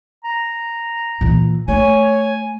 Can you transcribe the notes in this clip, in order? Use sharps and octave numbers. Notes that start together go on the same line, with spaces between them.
A#5
A#2 E3
A3 C#5 G#5